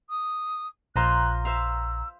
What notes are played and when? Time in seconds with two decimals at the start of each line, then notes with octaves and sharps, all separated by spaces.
0.10 D#6
0.96 A#1 F4 C5 D#5 A#5 F#6
1.45 C5 E5 F5 E6